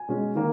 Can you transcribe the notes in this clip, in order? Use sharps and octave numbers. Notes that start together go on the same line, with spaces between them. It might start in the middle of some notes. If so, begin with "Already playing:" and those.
Already playing: G#5
B2 G#3 C#4
D#3 A#3